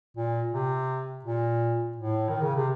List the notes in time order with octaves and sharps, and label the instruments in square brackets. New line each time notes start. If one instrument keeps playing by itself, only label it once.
[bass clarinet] A#2
C3
A#2
A2
D#3
C#3
C3